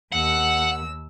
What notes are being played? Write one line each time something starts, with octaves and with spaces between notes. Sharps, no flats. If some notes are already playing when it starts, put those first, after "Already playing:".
D#2 F#5 E6